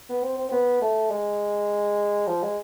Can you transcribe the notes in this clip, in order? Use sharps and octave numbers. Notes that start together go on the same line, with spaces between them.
B3
C4
C4
C4
B3
A3
G#3
F3
G#3